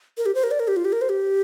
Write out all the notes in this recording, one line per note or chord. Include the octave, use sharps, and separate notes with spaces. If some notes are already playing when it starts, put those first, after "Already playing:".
A#4
G4
C5
A#4
D5
A#4
G4
F4
G4
A#4
C5
G4